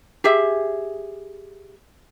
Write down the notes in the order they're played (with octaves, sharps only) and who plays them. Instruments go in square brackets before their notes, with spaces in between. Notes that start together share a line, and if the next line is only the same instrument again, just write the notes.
[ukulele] G4 G#4 E5